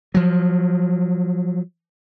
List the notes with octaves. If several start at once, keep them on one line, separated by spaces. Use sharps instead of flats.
F3 F#3